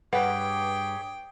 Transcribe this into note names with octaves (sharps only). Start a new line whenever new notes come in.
G2 G4 G#4 B4 C#5 D5 F#5 G5